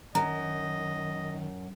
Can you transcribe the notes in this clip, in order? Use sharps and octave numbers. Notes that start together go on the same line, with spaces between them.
F#2 D#3 D#5 A#5